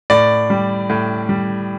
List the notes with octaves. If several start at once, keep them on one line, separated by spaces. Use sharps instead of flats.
A2 D5
G3
A2
G3